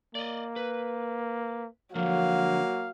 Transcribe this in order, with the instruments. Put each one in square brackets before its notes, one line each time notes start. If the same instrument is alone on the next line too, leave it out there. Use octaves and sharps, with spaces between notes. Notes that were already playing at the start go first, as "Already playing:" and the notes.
[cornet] A#3 [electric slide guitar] D5 D#5
[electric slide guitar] B4
[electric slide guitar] D3 F3 [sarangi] F#3 [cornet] A#3 [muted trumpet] F5